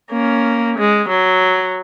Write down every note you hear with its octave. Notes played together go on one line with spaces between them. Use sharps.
A#3 C#4
G#3
F#3